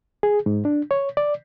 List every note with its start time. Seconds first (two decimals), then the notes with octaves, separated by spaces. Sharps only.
0.23 G#4
0.46 G#2
0.65 D4
0.91 C#5
1.17 D5